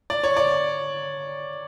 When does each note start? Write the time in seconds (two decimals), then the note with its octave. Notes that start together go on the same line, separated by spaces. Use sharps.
0.10 D5
0.24 C#5
0.36 D5